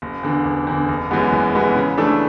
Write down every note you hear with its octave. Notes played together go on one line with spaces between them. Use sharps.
F#1
E2 D3
F#1
E2 D3
F#1
F#2 E3 G#3 B3
F#1
F#2 E3 G#3 B3
C#3
E3 A3 D4 A4